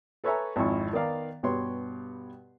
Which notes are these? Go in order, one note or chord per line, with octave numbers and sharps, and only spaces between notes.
A4 B4 C#5 E5 G#5 A#5
G#1 F2 F3 E4 D#5 C#6
D#3 B3 D5 F5 A#5
G2 B2 B3 G4 C#5 C6